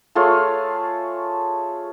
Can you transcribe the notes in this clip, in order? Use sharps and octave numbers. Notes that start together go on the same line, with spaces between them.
A3 F4 G#4 C#5